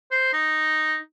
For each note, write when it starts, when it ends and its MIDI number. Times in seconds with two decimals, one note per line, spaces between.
0.11 0.33 72
0.33 0.98 63